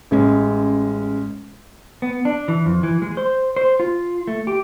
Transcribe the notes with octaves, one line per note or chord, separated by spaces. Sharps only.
A1 G#3 C#4
B3
D4
E3
F2
E3
G#3
C5
C5
F4
A3
G4